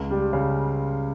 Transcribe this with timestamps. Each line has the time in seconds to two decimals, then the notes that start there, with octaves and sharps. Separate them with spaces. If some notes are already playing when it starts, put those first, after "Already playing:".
Already playing: C#2
0.11 G3
0.33 C#3